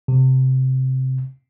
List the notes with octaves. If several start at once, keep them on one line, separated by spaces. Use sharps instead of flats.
C3